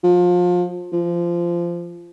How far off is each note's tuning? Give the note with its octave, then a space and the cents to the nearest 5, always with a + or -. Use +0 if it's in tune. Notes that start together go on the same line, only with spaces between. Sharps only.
F3 +30
F3 -20